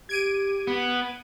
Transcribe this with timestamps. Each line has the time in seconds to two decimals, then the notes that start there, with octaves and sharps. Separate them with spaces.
0.09 G4 G#6 D7 D#7
0.67 B3